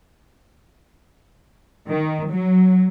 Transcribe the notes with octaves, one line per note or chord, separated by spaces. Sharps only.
D#3
F#3